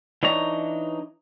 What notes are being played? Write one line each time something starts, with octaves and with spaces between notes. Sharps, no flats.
E3 D4 D#4 C#5 A#5